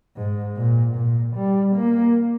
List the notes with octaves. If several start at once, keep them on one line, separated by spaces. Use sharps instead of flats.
G#2
A#2
A#2
G3
A#3